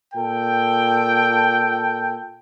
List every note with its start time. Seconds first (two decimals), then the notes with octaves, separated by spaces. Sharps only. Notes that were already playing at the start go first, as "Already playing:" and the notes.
0.14 A#2 A4 G5